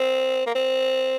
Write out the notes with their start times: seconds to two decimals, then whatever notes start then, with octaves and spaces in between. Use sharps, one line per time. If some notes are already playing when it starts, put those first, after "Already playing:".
Already playing: C4
0.46 A#3
0.55 C4